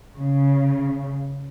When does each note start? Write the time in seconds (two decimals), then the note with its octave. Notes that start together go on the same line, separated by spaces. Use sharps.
0.18 C#3